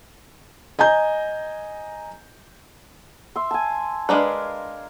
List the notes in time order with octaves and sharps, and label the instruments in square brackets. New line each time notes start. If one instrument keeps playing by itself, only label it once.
[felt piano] D#5 G#5 A#5 G6
[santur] E5 C6
G#5 A5
[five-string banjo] G#3 D4 B4 [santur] A#4 F5